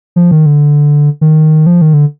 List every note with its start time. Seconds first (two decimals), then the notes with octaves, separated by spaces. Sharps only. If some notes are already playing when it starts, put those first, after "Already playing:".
0.16 F3
0.31 D#3
0.46 D3
1.21 D#3
1.66 F3
1.82 D#3
1.93 D3